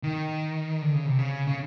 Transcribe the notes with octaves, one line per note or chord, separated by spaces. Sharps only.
D#3
D3
C#3
C3
C#3
C#3